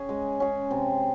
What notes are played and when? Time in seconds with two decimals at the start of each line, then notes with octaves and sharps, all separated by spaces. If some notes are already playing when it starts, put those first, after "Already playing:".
Already playing: C#4 G#4
0.09 G#3
0.40 C#4 G#4
0.71 C3